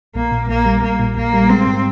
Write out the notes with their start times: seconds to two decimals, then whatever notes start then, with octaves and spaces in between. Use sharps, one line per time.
0.15 A#1 A#3
0.32 A#2
0.49 A#1 A#3
0.66 G3
0.82 A#1 A#3
1.00 A#2
1.16 A#1 A#3
1.33 G3
1.50 G#3 C4
1.67 G#2